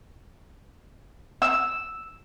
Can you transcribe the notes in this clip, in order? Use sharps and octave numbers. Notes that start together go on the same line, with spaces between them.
E6